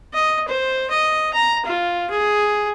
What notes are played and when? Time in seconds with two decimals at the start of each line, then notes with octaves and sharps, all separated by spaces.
0.13 D#5
0.48 C5
0.90 D#5
1.33 A#5
1.65 F4
2.10 G#4